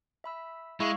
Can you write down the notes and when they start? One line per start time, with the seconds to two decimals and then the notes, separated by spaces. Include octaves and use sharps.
0.24 E5 B5 E6
0.80 G#3 E4 F5 C#6 E6